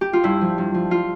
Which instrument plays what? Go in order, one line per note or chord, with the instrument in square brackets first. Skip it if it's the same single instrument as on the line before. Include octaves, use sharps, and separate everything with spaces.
[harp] G4
F4
G2 E4
F3
G2
F3
F4